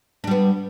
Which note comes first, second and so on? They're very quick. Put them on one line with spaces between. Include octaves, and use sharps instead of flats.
D4 G3 B3